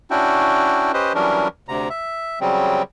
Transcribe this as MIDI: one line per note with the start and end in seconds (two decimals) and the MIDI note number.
0.11 0.92 61
0.11 0.92 62
0.11 0.92 64
0.11 0.92 66
0.11 0.92 79
0.94 1.13 61
0.94 1.13 67
0.94 1.13 71
0.94 1.13 72
0.94 1.13 75
1.15 1.48 52
1.15 1.48 54
1.15 1.48 55
1.15 1.48 61
1.15 1.48 62
1.15 1.48 70
1.68 1.89 38
1.68 1.89 48
1.68 1.89 82
1.90 2.39 76
2.41 2.82 49
2.41 2.82 54
2.41 2.82 55
2.41 2.82 60